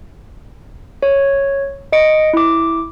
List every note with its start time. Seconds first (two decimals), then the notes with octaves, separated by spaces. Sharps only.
1.03 C#5
1.93 D#5 C#7 D7
2.33 E4 D6